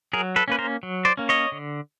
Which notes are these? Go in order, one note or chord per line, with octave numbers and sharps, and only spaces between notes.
F#3 G#4 A#4
A4 B4
A#3 C#4 B4
A#4 C5
F#3
C5 D5
A#3 C#4
C#5 D#5
D3